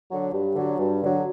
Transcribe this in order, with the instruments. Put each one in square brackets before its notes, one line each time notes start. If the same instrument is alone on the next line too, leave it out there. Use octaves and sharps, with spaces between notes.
[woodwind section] D3 F#3
G2
D3 F#3
G2
D3 F#3